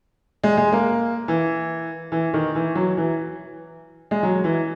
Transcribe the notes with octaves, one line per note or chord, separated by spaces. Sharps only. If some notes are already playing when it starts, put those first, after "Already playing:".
G#3
G#3
A#3
E3
E3
D#3
E3
F#3
E3
G#3
F#3
E3